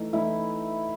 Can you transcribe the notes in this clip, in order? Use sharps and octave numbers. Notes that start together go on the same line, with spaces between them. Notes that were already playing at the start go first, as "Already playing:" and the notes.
Already playing: E3 A3 D#4
E3 A3 D#4 E4